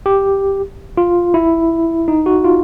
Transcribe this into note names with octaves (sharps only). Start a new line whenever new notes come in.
G4
F4
E4
D#4
F#4
F4